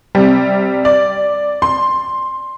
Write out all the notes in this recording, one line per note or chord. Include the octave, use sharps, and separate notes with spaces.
C3 G3
D5
C6